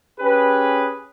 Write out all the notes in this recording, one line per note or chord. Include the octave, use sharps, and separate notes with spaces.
C#4 G4 G#4 B4